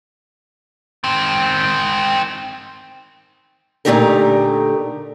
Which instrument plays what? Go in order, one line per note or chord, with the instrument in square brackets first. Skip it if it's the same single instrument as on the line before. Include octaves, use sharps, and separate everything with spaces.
[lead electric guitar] D#3 C4
[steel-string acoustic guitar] A#2 D3 A3 D#4 G4 A#4